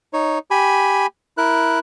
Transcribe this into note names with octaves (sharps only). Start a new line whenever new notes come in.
D#4 C#5
G4 G#5 B5
E4 A#4 F#6